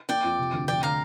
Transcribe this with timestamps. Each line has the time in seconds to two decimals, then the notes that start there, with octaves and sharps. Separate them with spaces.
0.09 A#3 D5 G5
0.24 F2
0.39 C3
0.53 D2
0.68 F1 D5 G5
0.83 D3 F5 A#5